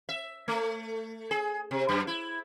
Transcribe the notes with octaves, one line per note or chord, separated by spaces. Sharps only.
E5
A3
G#4
C3
F#2
E4